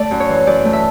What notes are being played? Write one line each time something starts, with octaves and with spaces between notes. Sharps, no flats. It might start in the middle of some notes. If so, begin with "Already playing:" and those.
Already playing: A3 D5
F#2
C#5
E3
F#2 D5
A3
E5